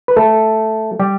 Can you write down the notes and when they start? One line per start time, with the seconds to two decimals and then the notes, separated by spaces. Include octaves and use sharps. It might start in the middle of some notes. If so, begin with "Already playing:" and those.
0.08 B4
0.16 A3 A4
0.99 G3 G4